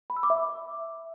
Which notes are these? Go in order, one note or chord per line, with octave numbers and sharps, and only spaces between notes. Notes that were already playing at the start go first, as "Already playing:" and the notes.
B5
E6
D6
E5